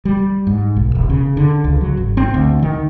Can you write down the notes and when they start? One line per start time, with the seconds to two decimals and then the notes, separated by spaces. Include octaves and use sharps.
0.05 G3
0.47 G#2
0.76 B1
0.95 E1
1.10 C#3
1.37 D3
1.64 C#2
1.81 F#3
1.97 G#1
2.17 C4
2.34 D2
2.63 D#3